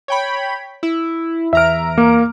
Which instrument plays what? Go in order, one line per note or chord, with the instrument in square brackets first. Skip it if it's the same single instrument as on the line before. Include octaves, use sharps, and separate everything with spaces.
[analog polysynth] C#5 G5 B5
E4
[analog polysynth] E2 A#5 D7 [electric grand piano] E5 F6
[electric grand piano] A#3